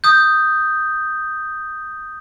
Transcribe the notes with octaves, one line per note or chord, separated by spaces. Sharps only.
D#6 G6